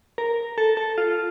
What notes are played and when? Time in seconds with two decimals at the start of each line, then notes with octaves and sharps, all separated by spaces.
0.18 A#4
0.58 A4
0.77 A4
0.98 F4